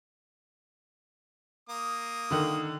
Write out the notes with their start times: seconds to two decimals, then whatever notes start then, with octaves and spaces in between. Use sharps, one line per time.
1.69 A#3 D#6
2.31 D3 D#3